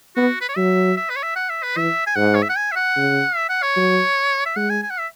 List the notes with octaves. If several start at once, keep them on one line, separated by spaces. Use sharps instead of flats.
B3 F#4
B4
C#5
F#3 E5
E5
B4
C#5
E5
F#5
E5
B4
E3 E5
G#5
G#2 F#5
C#5
E5
F#5
G#5
E5
F#5
C#3
E5
F#5
C#5
F#3
E5
G#3 F#5
G#5
G#5
F#5
E5